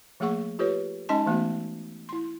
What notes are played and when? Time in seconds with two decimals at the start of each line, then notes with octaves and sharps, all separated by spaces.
0.20 F3 A3 A#3 G#4 F#5 C#6
0.59 F4 G4 A4 B4 C#5
1.09 G#3 C#4 D#4 D#5 A5 C6
1.26 E3 A3 B3 F#4
2.09 E4 C6